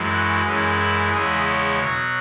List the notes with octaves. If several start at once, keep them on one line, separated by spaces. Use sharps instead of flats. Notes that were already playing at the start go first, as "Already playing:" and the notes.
Already playing: F#2 E3 G#3
F#4
F#2 E3 G#3 C#4
E4
E2 C#3 E3 G#3 G#4
C#5
B2 F#3